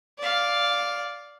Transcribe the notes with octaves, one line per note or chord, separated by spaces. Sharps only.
D5 F5